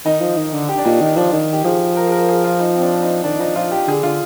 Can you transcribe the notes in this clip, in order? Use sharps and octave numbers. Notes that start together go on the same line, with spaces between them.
D#3 D#4
F3
D#3
D3
G4
D4
A#2 D#4
D#3
F3 D4
D#3
G4
F3 G#4
A#4
G#4
A#4
G#4
F4
D#4
C4
D4
D#4
D#3 D4
F3 D#4
F3 F4
G4
D3 G#4
D3 F4